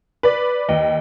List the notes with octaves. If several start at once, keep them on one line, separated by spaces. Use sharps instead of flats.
B4 D5
D#2 D#5